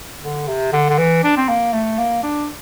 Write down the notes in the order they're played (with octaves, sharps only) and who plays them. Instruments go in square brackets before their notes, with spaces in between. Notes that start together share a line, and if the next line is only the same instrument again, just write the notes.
[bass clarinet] D3
C3
D3
D3
E3
D4
C4
A#3
A3
A#3
D4